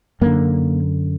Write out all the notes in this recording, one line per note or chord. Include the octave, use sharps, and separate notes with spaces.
F#2 D3 A#3